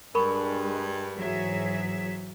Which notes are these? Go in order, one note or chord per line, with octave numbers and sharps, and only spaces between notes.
G2 G#3 D4 A#4 B5 C#6
G#2 E3 F#3 G#4 E5